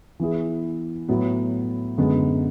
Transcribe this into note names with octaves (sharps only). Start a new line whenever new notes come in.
E3 B3 E4 G#4
A2 F#3 B3
F#2 D3 G#3 B3